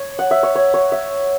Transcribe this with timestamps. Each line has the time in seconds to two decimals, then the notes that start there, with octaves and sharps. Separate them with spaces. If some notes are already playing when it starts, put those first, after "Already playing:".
Already playing: C#5
0.19 F#5
0.31 E5
0.43 C#5
0.55 C#5
0.74 C#5
0.92 E5